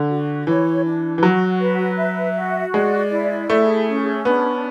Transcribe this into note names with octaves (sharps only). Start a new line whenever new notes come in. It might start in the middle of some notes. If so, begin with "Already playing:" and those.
Already playing: D3
F#4
E3 C#5
D4
E3
F#3 F#4
B4
E5
F#4
G#3 D5
E4
A3 G#4
C#4
B3 D4